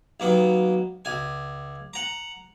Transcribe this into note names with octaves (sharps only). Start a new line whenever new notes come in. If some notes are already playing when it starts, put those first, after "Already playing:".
D#2 F#3 B3
C#2 G#5
F#5 A#5